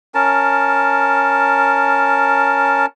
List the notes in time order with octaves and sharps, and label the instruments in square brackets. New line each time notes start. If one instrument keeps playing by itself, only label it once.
[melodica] C#4 A#4 A5